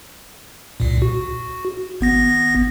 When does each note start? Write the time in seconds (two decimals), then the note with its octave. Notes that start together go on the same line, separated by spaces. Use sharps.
0.80 C2 A#2
1.02 F#4
2.01 G#1 B3 A#6